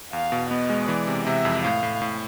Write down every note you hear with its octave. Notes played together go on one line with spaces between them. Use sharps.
E2 F5
B2
B3 D#5
G#3
E3 D5
C3
C3 E5
F2
A2 F5
A2
A2